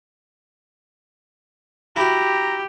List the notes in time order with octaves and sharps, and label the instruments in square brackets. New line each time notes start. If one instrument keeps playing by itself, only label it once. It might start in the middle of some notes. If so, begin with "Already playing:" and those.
[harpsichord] E4 F#4 [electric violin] G4 [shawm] A#5